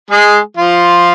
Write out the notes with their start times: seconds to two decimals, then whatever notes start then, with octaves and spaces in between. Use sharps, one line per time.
0.10 G#3 G#4
0.57 F3 F4